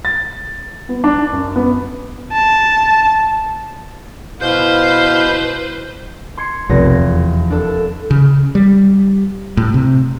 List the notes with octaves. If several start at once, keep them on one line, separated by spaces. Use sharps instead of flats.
A6
B3
D4
F#2
B3
A5
B2 E4 B4 C5 F5 G6
C6 G#6 C#7
F1 B1 F3 A3 A#6
E2
D4 A4
C#3
G3
A2
C3